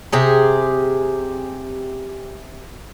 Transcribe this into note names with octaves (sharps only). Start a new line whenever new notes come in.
C3 G4 G#4